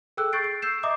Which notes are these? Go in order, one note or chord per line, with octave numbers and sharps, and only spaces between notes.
G#4 A4 G5 E6 F#6
C#6 G6 A6 C7 D7
C7
E6 G6 C7 E7
D#5 E5 A#5 D6 D#6